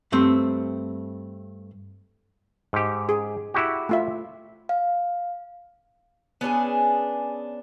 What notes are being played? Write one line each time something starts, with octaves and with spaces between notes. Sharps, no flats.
G2 A3 C4 C5
G#2 G4
G#4
E4 F#4 G4
A3 F4 E5
F5
B3 C#4 D4 G#4